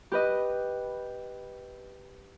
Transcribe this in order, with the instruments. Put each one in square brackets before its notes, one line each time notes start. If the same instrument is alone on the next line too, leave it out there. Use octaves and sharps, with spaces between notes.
[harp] G4 B4 D#5